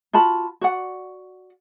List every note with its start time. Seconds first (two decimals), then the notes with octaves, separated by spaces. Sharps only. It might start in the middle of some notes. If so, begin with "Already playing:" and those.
0.13 F4 F#4 A5 B5
0.61 F#4 D5 F#5